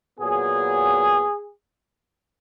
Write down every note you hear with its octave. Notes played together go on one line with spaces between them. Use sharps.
A#2 F#3 B3 G#4